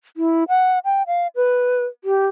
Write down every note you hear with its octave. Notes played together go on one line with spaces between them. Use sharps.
E4
F#5
G5
F5
B4
G4